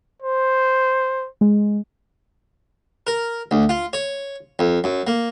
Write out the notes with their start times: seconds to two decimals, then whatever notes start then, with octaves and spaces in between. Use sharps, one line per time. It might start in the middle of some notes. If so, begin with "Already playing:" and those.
0.22 C5
1.41 G#3
3.07 A#4
3.51 D2
3.69 F4
3.93 C#5
4.59 F2
4.84 F#2
5.07 A#3